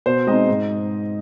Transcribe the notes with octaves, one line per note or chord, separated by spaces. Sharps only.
B2 C5
G#3 C4 D#4 D#5
G#2